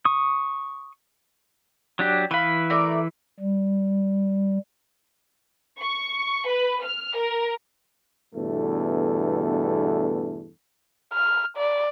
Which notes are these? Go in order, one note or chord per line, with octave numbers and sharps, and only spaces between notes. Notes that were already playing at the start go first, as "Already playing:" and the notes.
C#6 D#6
F#3 D4 G4
E3 B4 F5 B5
A3 A#4 D5
G3
C#6
B4
F6
A#4
E2 G2 B2 D3 A3 A4
F6
D5